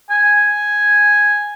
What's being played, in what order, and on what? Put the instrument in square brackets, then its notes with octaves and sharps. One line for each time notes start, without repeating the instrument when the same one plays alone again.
[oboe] G#5